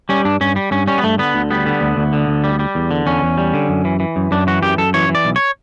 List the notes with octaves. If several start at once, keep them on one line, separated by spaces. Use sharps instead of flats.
G3 C#4
G2 D4
G2 C#4
G3
G2 C#4
G3 C#4
B3
G2 A3
D3 B3
D2
G3 B3
D3
D2
D2
D3
D2
G3
G3
E2
D3
E2 C#4
E2
G3
D3
F#2
E3
E3
F#2
F#2 D4
E3 F#4
F#2 G4
F#2 A4
E3 C#5
E3
D5
B1
C#5